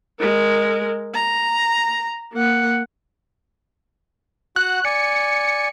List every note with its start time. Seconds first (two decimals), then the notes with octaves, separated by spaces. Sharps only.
0.19 G#3 A#4
1.14 A#5
2.33 A#3 F#5
4.56 F#4 F#5 F#6
4.85 D5 G#5 C#7